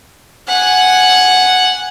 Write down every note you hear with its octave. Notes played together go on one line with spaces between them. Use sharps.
F#5 G#5